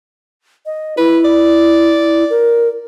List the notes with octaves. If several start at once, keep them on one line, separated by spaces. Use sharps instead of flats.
D#5
E4 B4
D5
A#4